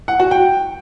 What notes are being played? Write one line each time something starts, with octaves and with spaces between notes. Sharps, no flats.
F#5
F#4
G5